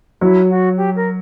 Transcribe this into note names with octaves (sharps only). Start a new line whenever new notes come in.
F#3 E4
F#4
G4
A#4